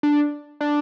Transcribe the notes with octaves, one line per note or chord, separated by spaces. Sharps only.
D4
D4